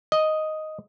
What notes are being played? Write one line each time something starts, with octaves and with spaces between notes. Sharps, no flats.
D#5